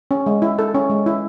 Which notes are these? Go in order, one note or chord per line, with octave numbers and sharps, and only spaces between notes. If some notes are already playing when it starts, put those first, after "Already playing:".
C#4
G#3
E4
A4
C#4
G#3
E4